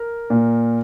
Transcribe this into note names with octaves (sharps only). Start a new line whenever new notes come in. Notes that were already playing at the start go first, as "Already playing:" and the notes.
Already playing: A#4
A#2